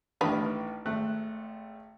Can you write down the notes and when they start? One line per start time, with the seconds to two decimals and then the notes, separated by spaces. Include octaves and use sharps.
0.21 A1 D#3 A3 B3 D4 B4
0.86 G#1 A3 F#6